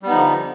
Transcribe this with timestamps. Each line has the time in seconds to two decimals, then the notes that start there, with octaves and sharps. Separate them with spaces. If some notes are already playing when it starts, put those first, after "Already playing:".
0.03 G3
0.06 B3
0.10 D#4
0.13 F3
0.16 D3